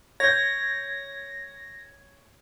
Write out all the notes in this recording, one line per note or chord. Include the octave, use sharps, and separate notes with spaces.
C#5 G6 G#6 A#6